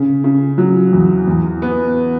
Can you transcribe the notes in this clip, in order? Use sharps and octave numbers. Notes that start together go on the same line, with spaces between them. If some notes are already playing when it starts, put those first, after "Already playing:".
Already playing: C#3
C#3
F#3
E2
E2
B3